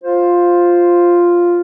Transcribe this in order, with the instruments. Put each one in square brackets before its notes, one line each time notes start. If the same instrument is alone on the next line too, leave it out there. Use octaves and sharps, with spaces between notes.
[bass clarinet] F4 [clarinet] C5